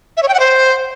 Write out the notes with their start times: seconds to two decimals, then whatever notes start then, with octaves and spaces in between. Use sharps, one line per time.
0.17 E5
0.23 C#5
0.28 G5
0.34 F#5
0.40 C5